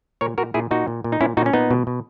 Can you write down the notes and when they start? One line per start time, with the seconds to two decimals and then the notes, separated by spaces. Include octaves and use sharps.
0.21 A#2 A#4 C#5
0.38 A#2 F#4 A#4
0.54 A#2 E4 G#4
0.71 A#2 D#4 F#4
0.87 A#2
1.04 A#2
1.12 D#4
1.21 A#2 C#4 E4
1.37 A#2 D#4 F#4
1.46 C#4
1.53 A#2 B3 D#4
1.71 B2
1.87 B2